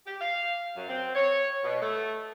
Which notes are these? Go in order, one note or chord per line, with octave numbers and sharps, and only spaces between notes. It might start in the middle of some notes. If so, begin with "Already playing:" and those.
G4
F5
F#2
C4
C#5
B2
A3